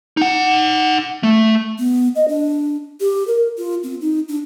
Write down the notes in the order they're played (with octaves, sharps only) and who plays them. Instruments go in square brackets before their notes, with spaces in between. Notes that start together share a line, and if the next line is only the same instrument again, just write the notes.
[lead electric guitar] D#4 F#5
A3
[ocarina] B3
D#5
D4
G4
A#4
F4
C4
D#4
D4